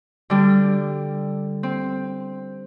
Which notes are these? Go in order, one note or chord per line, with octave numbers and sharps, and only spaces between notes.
D3 G3
C4